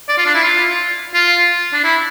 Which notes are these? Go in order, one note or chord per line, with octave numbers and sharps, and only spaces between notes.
D5
F4
D4
E4
F4
F4
D4
E4